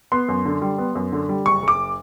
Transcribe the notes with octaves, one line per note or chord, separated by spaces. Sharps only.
B3 C6
F#2
D3
G3
B3
F#2
D3
G3
F#1 C#6
F#1
D6